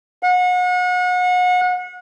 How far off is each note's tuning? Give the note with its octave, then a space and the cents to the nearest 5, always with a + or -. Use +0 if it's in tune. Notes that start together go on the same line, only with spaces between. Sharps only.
F#5 -35